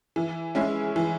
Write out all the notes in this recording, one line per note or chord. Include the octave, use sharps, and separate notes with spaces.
E3
G#3 C#4 E4
E3